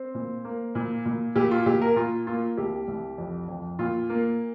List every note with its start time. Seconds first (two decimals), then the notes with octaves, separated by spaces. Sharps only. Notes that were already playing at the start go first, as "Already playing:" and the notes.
Already playing: C4 C5
0.15 A#2
0.45 A#3
0.75 A#2
1.06 A#2
1.36 A#2 G4
1.51 F4
1.66 A#2 G4
1.82 A#4
1.96 A#2 F4
2.27 A#3 F4
2.57 C2 G4
2.88 C2
3.18 F2
3.48 F2
3.79 A#2 F4
4.10 A#3